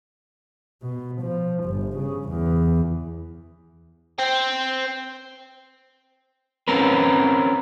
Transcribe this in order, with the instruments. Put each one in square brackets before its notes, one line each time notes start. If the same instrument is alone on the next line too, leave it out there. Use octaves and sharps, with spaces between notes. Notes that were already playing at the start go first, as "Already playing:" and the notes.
[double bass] B2
F3
G1
C#3
E2
[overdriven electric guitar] C5 G5
[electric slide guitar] C4 C#4 A#4 B4